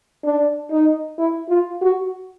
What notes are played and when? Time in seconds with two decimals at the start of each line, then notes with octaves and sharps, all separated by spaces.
0.24 D4
0.71 D#4
1.18 E4
1.49 F4
1.81 F#4